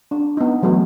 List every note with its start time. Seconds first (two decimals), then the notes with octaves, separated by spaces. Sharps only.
0.11 D4
0.37 B3 D#4
0.62 E3 F#3 A3 B3